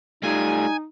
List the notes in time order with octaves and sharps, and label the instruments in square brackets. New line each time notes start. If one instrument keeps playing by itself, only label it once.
[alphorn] G3 [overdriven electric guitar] A3 F4 [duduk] D#4 [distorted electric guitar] G#5